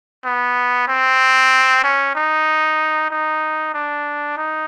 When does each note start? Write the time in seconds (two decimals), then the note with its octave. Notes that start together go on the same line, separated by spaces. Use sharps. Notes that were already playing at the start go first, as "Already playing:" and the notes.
0.24 B3
0.88 C4
1.84 C#4
2.15 D#4
3.10 D#4
3.74 D4
4.37 D#4